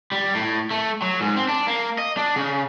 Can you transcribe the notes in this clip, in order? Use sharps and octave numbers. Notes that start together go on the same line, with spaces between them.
G3
A2
A3
F#3
G#2
C4
D4
A#3
D#5
D4
C#3